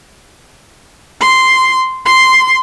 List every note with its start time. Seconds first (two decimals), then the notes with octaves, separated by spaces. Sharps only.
1.20 C6
2.05 C6